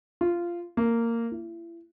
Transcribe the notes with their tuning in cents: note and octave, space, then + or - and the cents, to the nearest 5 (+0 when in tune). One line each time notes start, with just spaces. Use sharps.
F4 -15
A#3 -15
E4 +35